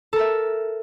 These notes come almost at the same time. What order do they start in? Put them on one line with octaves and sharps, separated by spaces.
A4 A#4 E5